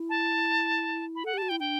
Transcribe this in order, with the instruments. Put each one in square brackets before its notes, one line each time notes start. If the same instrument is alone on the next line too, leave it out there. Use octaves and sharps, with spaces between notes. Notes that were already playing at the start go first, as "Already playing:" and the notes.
Already playing: [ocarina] E4
[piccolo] A5
B5
[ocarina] A4 [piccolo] F#5
[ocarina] G4
[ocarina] F#4 [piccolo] A5
[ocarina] E4 [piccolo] G5
[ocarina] D4 [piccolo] G5